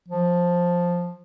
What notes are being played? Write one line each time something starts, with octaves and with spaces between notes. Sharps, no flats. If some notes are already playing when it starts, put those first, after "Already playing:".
F3